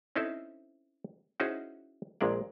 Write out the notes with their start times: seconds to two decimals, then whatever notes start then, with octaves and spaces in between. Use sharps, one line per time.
0.16 C4 C#4 D#4 E4 A4 C5
1.40 C#4 D#4 E4 F#4 G#4 C5
2.21 A#1 A#2 G#3 D4 D5